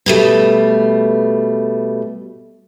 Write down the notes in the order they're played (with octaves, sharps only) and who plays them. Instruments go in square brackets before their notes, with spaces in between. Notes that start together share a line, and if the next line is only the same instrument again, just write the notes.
[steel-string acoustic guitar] B2 G3 A3